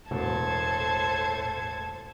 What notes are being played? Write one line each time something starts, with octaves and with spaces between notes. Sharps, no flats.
E1 A2 A4 C5 A5 G#6